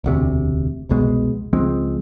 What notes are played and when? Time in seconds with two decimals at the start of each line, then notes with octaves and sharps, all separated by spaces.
0.04 E1 D2 C3
0.89 F1 C2 B2 G#3
1.53 C#2 F3 G#3 C4